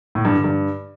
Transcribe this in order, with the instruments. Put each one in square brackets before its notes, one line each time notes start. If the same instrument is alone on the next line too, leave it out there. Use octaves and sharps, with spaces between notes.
[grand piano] A2
G2
D3
G2